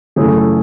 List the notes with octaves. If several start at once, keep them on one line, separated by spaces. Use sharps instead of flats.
F#2 C#3 E3 A3 G#4
A4